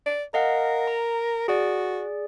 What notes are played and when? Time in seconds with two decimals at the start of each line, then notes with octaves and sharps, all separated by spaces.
0.06 D5
0.34 A#4 D#5 F5 F#5
0.87 A#5
1.48 F#4 G#4 D5